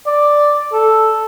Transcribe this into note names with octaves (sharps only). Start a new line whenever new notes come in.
D5
A4